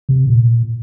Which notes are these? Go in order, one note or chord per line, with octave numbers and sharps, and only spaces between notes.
C3
A#2